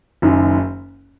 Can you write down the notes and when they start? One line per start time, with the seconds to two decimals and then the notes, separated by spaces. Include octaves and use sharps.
0.22 F#1 F#2 D#3